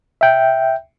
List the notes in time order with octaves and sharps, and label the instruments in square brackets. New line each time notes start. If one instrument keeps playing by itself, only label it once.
[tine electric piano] E5 G5